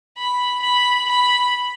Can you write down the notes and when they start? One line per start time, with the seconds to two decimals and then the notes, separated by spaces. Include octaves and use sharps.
0.18 B5
0.63 B5
1.08 B5